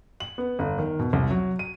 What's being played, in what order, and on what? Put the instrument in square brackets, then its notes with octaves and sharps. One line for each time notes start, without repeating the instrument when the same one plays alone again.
[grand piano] F#7
B3
G1
D#3
B2
C2
F#3
D#7